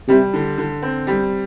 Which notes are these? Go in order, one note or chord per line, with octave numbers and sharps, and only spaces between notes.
C3 G3
D3
D3
C4
G3